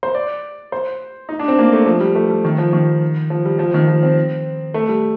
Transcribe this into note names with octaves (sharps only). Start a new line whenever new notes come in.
C5
D5
C5
D#4
D4
C4
A#3
A3
F3
G3
A3
G3
D#3
F3
D#3
F3
G3
F3
D#3
F3
C4
A3
G3